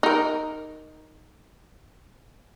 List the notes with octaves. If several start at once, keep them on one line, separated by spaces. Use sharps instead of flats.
D#4 A#4